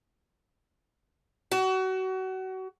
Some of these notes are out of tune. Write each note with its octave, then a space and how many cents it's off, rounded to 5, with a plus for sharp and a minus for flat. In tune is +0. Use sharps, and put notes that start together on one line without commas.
F#4 +30